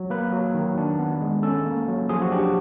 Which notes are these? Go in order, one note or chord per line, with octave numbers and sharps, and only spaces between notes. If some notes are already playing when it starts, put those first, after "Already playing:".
Already playing: F#3
A#3 B4
F#3
D#3
D4
B3
G#3
C#4 A4
A#3
F#3
F3 G#4
F#4
D4 G4